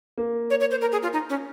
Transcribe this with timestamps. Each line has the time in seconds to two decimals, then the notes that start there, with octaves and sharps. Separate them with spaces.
0.18 A#3
0.50 C#5
0.60 C#5
0.71 C5
0.81 A#4
0.92 G#4
1.03 F4
1.13 D#4
1.29 C#4